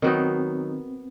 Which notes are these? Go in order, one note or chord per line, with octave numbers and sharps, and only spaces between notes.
D#3 F#3 B3 C4 D#4